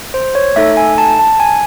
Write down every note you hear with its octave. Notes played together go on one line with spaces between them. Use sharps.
C5
C#5
A3 D#4 A4 E5
G#5
A5
A5
G#5